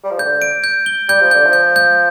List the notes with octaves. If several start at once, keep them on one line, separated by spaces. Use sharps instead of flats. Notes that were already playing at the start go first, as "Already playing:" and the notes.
G3
F3
D3 G6
D7
G6
G7
G3 G6
F3
D3 G6
F3
G6
G6